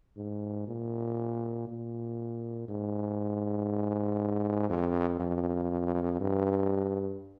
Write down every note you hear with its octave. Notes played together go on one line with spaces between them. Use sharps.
G#2
A#2
A#2
G#2
F2
F2
G2